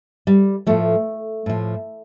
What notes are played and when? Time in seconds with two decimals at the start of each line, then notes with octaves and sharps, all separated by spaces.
0.27 G3
0.67 A2 F3 A3
1.46 A2 F3